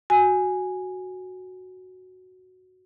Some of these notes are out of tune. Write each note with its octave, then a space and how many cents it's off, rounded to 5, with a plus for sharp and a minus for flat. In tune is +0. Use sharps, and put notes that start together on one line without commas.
F#4 +0 G#5 +0